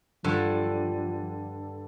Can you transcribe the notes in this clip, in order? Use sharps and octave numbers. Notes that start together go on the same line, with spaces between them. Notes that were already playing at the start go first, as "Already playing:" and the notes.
G2 D3 F3